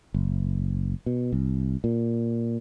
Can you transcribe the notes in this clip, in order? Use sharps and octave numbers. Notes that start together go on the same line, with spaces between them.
F#1
B2
C2
A#2